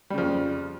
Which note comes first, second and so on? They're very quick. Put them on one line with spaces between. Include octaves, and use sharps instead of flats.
G3 C#3 F3 F2